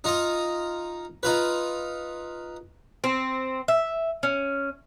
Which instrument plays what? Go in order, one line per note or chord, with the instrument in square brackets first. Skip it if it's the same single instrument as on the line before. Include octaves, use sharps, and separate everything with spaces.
[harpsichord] D#4 F4 D#5
D#4 F4 B4
[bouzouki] C4
E5
C#4